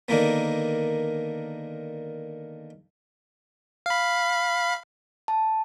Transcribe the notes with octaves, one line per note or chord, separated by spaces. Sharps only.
D3 D#3 A#3 B3
F5 B5
A5